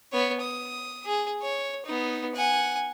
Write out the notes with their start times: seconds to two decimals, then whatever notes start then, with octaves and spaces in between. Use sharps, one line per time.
0.12 B3 C#5
0.41 D#6
1.05 G#4
1.42 C#5
1.86 B3 D#4
2.34 F#5 G#5